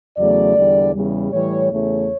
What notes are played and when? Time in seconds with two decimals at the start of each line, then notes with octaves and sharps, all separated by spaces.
0.17 E2 C#3 F#3 A3 D5
0.56 E2 D3 G3
0.94 E2 C#3 G3
1.32 A2 E3 G3 C#5
1.71 E2 C#3 E3 A3 C#5